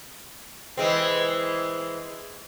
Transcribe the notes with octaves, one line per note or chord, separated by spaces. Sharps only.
E3 G#3 C4